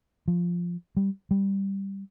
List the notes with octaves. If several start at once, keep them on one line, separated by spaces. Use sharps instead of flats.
F3
G3
G3